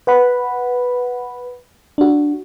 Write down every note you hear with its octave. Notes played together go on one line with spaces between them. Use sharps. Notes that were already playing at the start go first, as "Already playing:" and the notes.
B4 F#5 B5
D4 F#4